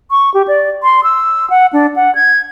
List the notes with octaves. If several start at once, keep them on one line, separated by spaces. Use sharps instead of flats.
C#6
G4
D5
C6
E6
F#5
D4
F#5
G#6